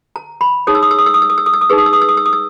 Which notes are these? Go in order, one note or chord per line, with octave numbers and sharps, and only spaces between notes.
A#5
B5
D#4 G#4 C#5 D#6
E6
D#6
E6
D#6
E6
D#6
E6
D#6
E6
D#6
E6
D#6
D#4 G#4 B4 E6
D#6
E6
D#6
E6
D#6
E6
D#6
E6